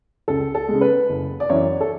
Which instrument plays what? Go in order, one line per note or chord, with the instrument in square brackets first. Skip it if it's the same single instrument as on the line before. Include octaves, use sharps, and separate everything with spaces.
[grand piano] C#2 A4
A4
C#3 G#3
B4
F#1
D5
F#2 E3 C#5
A4